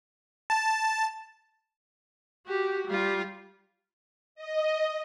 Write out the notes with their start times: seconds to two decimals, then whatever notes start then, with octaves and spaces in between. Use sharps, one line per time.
0.50 A5
2.47 F#4 G4
2.87 G3 F4
4.35 D#5